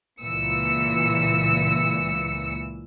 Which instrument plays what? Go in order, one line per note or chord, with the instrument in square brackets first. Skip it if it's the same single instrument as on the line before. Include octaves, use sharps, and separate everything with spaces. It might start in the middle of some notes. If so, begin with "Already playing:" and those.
[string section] C#2 A#2 E3 E6 C#7